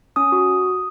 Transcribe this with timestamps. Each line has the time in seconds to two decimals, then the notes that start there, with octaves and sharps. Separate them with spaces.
0.16 C#4 D#6
0.32 F#4